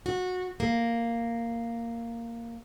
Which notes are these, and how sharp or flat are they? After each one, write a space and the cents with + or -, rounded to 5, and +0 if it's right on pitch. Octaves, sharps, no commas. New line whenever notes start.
F#4 -20
A#3 -5